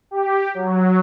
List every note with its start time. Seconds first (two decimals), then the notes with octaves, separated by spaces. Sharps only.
0.11 G4
0.54 F#3